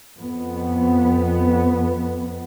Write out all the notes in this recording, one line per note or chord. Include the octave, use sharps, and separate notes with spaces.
F2 B3